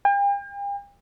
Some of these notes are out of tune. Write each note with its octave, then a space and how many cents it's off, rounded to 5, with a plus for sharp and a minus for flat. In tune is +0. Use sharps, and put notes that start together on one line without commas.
G5 +45